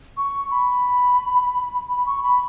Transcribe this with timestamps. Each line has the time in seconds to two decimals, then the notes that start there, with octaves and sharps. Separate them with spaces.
0.17 C#6
0.51 B5
1.90 B5
2.06 C#6
2.23 B5